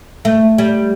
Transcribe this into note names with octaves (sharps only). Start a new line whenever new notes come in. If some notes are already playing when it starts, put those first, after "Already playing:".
A3
G3